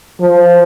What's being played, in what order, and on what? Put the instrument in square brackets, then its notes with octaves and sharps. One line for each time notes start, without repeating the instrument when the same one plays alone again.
[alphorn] F3